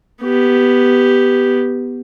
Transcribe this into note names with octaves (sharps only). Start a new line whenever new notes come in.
B3 G4